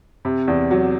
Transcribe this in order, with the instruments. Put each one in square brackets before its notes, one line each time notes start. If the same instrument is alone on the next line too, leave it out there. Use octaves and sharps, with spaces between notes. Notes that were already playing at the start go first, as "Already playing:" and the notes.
[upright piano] C3
E2
F#3